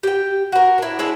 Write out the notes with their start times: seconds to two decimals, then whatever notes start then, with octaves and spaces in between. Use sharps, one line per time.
0.03 G4 G5
0.52 F#4 A#4
0.78 D4 E4
0.99 G#3 D4 E4 A4